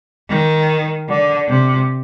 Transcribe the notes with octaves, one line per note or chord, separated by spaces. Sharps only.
D#3
D3
C3